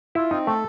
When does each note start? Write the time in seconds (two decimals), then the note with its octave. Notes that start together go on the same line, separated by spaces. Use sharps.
0.15 E4 F4
0.31 C4 D#4
0.47 A3 A4